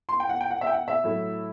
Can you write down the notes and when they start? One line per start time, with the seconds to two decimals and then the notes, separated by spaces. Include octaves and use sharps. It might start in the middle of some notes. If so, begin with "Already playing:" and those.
0.09 C6
0.20 G5
0.29 F#5
0.41 G5
0.51 F#5
0.61 E5
0.67 G5
0.73 F#5
0.88 E5
1.04 A2 F#3 A3 E4